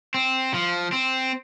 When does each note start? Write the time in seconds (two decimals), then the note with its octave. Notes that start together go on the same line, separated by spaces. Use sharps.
0.14 C4
0.54 F3
0.92 C4